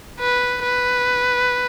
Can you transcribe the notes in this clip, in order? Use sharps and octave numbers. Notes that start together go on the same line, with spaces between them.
B4
B4